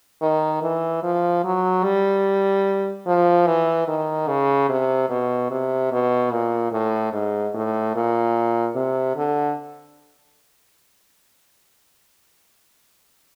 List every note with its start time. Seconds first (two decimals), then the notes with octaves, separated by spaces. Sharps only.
0.22 D#3
0.62 E3
1.03 F3
1.44 F#3
1.84 G3
3.06 F3
3.47 E3
3.88 D#3
4.28 C#3
4.69 C3
5.09 B2
5.50 C3
5.92 B2
6.31 A#2
6.72 A2
7.13 G#2
7.54 A2
7.95 A#2
8.75 C3
9.16 D3